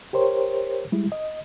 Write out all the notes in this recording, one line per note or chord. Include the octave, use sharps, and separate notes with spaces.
G4 A#4 C5 C#5
G3 G#3 E4
D#5